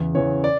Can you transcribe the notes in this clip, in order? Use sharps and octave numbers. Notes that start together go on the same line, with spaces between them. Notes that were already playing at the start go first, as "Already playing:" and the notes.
Already playing: E2 C#3 E3
E2 C#3 E3 C#5
D5